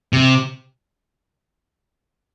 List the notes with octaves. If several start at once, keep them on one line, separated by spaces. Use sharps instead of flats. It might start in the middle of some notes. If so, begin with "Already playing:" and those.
C3